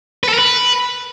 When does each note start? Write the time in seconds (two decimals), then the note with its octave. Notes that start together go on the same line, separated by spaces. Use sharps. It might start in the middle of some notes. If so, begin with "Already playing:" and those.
0.23 B4
0.28 A4
0.34 A#4
0.39 B4